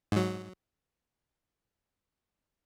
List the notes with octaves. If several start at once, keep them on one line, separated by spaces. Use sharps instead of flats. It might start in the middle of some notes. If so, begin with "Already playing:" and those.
G#2 F#3